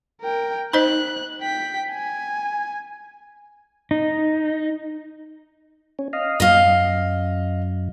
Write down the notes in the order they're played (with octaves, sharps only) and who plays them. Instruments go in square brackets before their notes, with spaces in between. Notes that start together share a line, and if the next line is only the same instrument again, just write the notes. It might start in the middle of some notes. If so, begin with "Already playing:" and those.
[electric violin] A#4 G5
[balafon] D#4 C5 D#5 [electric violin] F#6
[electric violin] G5 B6
G#5
[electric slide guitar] D#4
[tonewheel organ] C#4
D#5 F5
[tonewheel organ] F#2 [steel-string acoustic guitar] D#5 F5